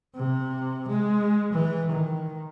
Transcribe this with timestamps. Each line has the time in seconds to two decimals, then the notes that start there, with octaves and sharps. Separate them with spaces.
0.15 C3
0.88 G#3
1.53 E3
1.92 D#3